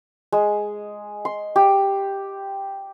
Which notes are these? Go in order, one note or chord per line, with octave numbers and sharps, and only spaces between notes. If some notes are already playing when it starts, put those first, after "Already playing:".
G#3
C6
G4